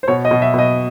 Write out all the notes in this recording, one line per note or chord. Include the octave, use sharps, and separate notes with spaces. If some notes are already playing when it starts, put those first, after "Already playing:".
C5
B2 C#5
D#5
B2
E5
B2 D#5